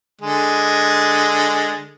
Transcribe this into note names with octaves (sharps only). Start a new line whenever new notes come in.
D3 G#3